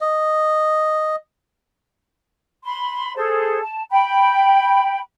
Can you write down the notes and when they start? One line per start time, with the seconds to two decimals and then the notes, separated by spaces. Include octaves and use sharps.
0.01 D#5
2.64 B5 C6
3.15 G#4 A4 C5
3.61 A5
3.90 G5 B5